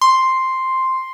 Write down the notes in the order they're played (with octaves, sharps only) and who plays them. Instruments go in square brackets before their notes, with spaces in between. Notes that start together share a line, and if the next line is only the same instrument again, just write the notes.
[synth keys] C6